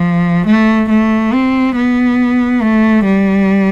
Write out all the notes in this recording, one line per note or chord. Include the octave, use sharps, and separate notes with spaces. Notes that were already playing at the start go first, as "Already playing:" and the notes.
Already playing: F3
A3
A3
C4
B3
A3
G3